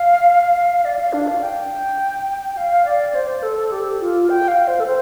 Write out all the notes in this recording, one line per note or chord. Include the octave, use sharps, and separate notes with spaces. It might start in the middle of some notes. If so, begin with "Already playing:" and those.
Already playing: F5
D5
F5
D4
F5
G5
F5
D5
C5
A4
G4
F4
G5
F5
C5
A4
C5